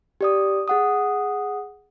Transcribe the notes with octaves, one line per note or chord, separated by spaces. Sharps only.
G4 D5 D#6
G#4 F#5 D#6